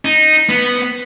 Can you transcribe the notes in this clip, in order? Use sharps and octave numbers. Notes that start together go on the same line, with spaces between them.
D#4
B3